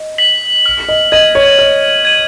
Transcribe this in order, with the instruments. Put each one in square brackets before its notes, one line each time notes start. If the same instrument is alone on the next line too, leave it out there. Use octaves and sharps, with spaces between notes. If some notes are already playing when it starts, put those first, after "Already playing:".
Already playing: [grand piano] D#5
[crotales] B6 F#7
F6
[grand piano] D#5
[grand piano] D#5 [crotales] G#6 D#7 F#7
[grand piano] C#5
[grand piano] C#5 [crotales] F6
[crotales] G#6 D#7 F#7